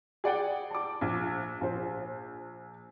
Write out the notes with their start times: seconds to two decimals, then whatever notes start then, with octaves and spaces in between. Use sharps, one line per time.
0.24 G#4 D5 F#5 G5
0.71 A5 D6
1.01 A#1
1.61 A#1 C5